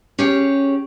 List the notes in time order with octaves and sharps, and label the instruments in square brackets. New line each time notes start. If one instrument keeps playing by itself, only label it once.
[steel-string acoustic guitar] C#4 G4 G#4 C#5